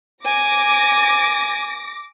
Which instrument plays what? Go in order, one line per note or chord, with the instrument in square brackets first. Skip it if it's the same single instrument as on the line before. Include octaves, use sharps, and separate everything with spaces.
[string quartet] G#5 [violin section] D6 A#6